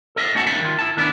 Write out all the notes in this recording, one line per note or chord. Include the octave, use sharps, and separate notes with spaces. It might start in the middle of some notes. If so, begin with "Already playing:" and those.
A4 D#5 E5
A3 C#4 F#4 F#5 A5
C#2 D#3 G3 D4 E5
D#3 F4
E4 A5
D#3 A3 B3 D4 E4